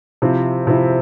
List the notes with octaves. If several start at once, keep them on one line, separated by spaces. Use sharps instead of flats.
C3 F3 C4 E4
C3 F3 C4 E4